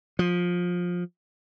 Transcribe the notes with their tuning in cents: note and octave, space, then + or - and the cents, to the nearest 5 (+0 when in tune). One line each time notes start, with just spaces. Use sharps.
F3 +20